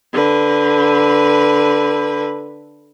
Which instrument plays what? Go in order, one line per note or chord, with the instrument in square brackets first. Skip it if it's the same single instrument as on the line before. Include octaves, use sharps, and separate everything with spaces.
[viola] D3 B4